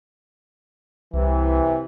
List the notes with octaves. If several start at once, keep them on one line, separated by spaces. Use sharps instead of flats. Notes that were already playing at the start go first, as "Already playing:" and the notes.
C2 C3 E3